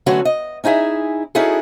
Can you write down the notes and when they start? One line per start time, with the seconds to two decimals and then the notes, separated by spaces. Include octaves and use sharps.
0.06 D3 F#3 A3 C#4 F#4 B4
0.25 D#5
0.64 C#4 D#4 E4 G#4 E5
1.35 C#4 D#4 E4 F#4 G#4 A4